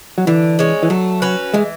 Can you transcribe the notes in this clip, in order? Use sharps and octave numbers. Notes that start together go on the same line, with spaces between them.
F#3
D3 E3
G#3 C#4
E3
F#3 A3
C#4 F#4 B4
E3 G#3